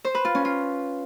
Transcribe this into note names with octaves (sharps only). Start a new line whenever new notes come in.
C5
B4
F4
C#4
F4